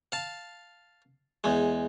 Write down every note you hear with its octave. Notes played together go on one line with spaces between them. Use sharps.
F5 A5
E2 G#3